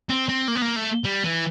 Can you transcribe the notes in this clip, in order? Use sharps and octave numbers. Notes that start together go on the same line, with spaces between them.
C4
C4
A#3
B3
A#3
A3
G3
E3